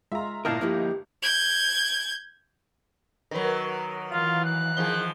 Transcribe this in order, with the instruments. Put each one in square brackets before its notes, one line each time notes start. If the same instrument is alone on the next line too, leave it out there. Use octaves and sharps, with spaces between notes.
[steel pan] G#3 F4 [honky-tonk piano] E5 A#5
[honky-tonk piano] G1 F4 D#5 [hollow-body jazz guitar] A#2 E4 A#4 [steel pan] F5 A5
[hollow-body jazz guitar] F3 A#3 E4 [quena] G4
[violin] G6 G#6
[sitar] D#3 F#3 [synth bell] A#4 B4
[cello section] E3 [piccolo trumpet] F4 [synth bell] F5
[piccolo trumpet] F#6
[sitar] D#3 F3 [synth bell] G#4 G7